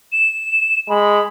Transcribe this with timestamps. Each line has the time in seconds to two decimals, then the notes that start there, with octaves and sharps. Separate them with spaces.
0.12 E7
0.89 G#3 B5